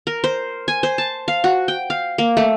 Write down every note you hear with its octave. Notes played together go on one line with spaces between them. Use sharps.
A#4
C5
G#5
C5
A5
F5
F#4
G5
F5
A#3
A3